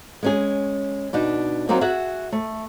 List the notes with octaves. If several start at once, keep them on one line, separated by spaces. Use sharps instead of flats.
G#3 C#4 G#4
B2 D4 D#4
F#3 A#3 C4 D#4 F4
F#4 G#4 E5 F#5
A3